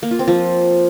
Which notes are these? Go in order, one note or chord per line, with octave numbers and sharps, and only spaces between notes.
A#3
F4
C4
F3